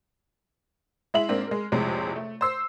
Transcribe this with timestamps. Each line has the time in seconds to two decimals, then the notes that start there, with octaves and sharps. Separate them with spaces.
1.14 G#3 E4 E5 F#7
1.29 G#2 A#3 C4 D4
1.47 G#3 A#4
1.72 A#1 F2 A2 C3 G#3
2.16 A3
2.41 C5 E6 C7